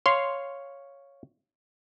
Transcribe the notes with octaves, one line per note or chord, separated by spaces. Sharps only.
C#5 F5 C6